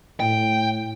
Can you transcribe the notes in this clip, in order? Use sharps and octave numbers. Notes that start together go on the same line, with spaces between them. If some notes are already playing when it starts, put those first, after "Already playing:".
A2 G5